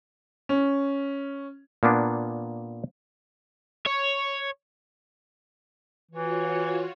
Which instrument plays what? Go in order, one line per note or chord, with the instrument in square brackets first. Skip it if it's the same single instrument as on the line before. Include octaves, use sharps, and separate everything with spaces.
[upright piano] C#4
[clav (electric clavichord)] A#2 A#3 B3 D4
[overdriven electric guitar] C#5
[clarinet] E3 [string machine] F4 F#4 C#5